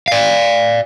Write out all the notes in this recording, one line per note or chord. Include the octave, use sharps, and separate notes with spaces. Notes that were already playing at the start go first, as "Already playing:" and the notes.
D5 F5